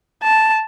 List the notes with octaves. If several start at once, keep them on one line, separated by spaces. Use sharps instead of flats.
A5